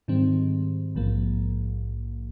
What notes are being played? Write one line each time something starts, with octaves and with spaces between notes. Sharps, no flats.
G#2 D#3 G3 C4
A#1 G#2 F3 A#3